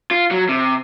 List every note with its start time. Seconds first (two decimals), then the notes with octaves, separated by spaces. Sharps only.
0.11 F4
0.31 F#3
0.49 C3